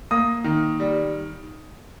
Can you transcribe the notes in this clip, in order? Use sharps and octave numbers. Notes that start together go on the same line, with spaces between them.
A#3 D#6
D#3
G3